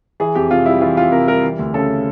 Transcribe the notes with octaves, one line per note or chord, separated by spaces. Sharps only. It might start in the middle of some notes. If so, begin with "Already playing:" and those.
E3 G#4
F2 G4
C3 F4
G3 E4
E3 F4
F2 F4
C3 A#4
G3 A#4
E3
D2
C#3 A4